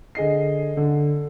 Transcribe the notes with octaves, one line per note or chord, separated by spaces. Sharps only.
D3 G#4 D#5 C7
D3